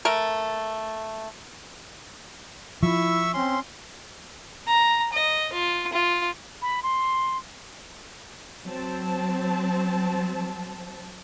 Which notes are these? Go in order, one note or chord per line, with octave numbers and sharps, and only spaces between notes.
A3 A#4
F3 E4 E5 C#6 E6
C4 C#4 C6
A#5
D#5
F4
F4
B5
C6
F#3 C4 A5